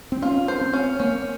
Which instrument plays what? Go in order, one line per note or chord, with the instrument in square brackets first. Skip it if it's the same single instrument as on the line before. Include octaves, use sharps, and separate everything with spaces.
[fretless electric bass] C4
[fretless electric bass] C#4 [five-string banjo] F4
[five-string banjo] C5
[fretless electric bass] C4
[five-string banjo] C#4
[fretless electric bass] A#3 [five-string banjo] C#4